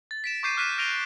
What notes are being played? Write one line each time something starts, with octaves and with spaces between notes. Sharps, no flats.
A6
B6 D7 E7
C#6 D6 G6 C7 D#7
D6 F6 F#6 B6 D#7 E7
F6 A#6 D7 D#7 F7 G7